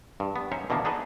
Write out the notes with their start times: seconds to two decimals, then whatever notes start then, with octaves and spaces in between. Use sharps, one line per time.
0.20 G2
0.36 B3
0.52 F#3 C#4 D#4 C5 C#5 E5
0.70 B2 D3 E3 A#3 B3 D4
0.84 D4 D#4 G#4 A4 B4 D#5